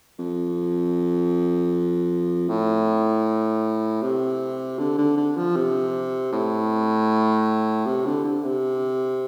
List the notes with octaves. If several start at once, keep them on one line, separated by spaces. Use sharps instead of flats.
F2
A2
C3
D3
D3
D3
F3
C3
A2
C3
D3
D3
C3